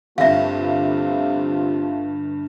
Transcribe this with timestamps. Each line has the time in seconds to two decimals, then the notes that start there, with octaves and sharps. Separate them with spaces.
0.18 G1 G2 C3 A3 F4 E5 F5